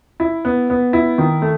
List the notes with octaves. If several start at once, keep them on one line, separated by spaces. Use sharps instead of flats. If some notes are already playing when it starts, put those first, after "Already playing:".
E4
B3
B3
E4
D#3
A3